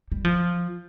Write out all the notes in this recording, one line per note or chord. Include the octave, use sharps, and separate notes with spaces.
G3
F3